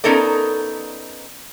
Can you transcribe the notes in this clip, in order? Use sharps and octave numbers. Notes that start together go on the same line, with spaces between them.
B3 C#4 D#4 A4 A#4 D5